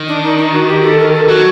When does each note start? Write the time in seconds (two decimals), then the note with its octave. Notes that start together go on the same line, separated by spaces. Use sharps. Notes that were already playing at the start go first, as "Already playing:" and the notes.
Already playing: D#3
0.08 D4
0.24 D#4
0.38 D#4
0.53 F#4
0.68 G4
0.84 A4
0.99 A#4
1.14 A4
1.28 F#3 F#4